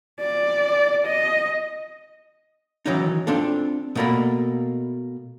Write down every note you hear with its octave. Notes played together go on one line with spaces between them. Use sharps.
D5
D#5
D#3 E3 F#3 C#4 D#4
C4 D4 F4 A4
B2 A3 A#3 A#4 D5 B5